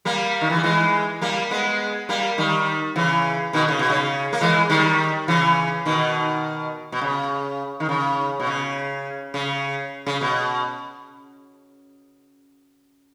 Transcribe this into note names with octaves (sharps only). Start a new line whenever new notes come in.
G3 A#3
D#3
E3
G3
E3 G#3
G3 A#3
G#3 B3
G3 A#3
D#3 G3
C#3 E3
B2 D#3
C#3
B2
C#3
A#3
E3 G#3
D#3 G3
C#3 E3
B2 D#3
B2
C#3
D#3
C#3
B2
C#3
C#3
C#3
B2